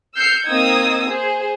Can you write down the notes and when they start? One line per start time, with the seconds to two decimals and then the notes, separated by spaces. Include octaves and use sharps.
0.15 E6 F6 G6 C7 C#7
0.45 A#3 C4 D#4 D#6 E6 G#6
1.09 G#4 C5